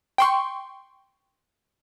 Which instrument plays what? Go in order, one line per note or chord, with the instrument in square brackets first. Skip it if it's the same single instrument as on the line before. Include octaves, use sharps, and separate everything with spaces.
[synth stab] G5 C6 C#6